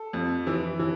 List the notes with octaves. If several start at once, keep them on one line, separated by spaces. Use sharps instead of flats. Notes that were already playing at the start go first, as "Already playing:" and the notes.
Already playing: A4
F2
E3
E3